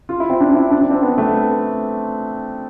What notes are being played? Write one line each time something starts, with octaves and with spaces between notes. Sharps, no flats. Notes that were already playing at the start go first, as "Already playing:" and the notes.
F4
E4
C4
D4
D4
E4
D4
D4
C4
B3
A3